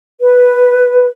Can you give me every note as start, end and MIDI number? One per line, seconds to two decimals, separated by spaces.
0.20 1.09 71